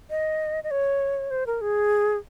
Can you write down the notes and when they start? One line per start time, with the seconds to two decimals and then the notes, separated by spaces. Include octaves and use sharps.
0.10 D#5
0.64 D#5
0.71 C#5
1.30 C5
1.47 A#4
1.61 G#4